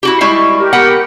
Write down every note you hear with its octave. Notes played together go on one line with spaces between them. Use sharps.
E4 F#4 G4
G3 G#3 E4 C#6
G4 A#4
B3 F#5 G5